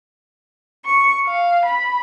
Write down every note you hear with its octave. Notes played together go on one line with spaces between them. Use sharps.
C#6
F5
B5